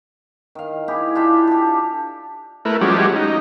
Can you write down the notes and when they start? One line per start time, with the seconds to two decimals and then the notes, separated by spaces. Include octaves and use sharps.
0.55 D#3 F5
0.88 E4 G4 G#4
1.15 D4 F4 G4 E5
1.47 G4 A4
2.65 A3 E4 A#4 B4
2.81 F3 G3 G#3 C#4 F#4 G4
3.16 D#4